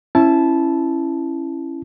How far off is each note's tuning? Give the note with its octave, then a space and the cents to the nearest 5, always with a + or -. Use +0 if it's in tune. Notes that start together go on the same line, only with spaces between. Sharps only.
C#4 -20 E4 +10 A5 -15